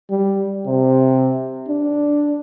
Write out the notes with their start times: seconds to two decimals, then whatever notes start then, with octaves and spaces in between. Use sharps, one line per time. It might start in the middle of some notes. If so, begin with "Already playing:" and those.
0.10 G3
0.66 C3
1.68 D4